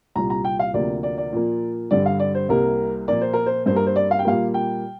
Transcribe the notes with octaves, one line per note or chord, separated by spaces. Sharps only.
C2 A#2 G3 A#5
A#5
G5
F5
D2 C3 F3 A#3 D5
D5
D5
A#2 F3 A#3
G2 D3 G3 D5
F5
D5
C5
C2 C3 G3 A#3 A#4
A#2 F3 A#3 D5
C5
A#4
C5
G2 G3 A#3 C5
A#4
C5
D5
F5
G5
A#2 G3 A#3 F5
G5